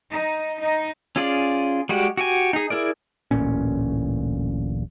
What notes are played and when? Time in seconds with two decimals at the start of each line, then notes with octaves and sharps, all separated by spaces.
0.12 D#4
0.61 D#4
1.16 C#4 F4 G#4 D5
1.89 G3 G#3 F#4 G4
2.17 F#4 G4 G#5
2.53 D#4 G#4
2.70 E4 G#4 A#4 D5
3.31 D1 A1 A#2 C#4